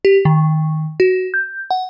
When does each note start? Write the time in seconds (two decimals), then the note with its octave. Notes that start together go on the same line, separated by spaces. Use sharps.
0.05 G4
0.25 D#3
1.00 F#4
1.34 G6
1.71 F#5